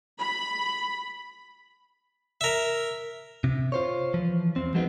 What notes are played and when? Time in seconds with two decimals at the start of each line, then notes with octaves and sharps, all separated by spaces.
0.19 B5
2.41 A#4 E5
3.44 C3
3.72 F4 C5 C#5
4.14 E3 F3
4.56 E2 C4
4.74 F3 F#3 G#3 B3 C4 D#4